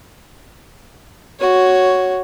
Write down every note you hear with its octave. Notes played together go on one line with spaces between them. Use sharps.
F#4 C#5